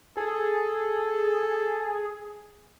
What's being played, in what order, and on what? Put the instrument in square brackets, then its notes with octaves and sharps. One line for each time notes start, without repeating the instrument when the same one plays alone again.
[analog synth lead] G#4 [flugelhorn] A4